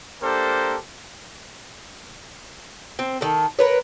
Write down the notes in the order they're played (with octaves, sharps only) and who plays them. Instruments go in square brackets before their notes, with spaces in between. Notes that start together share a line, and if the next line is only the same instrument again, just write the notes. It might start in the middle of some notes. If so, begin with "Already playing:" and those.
[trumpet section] A#3 D4 G4 A4 A#4 C5
[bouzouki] C4
D#3 A4
A#4 B4 C#5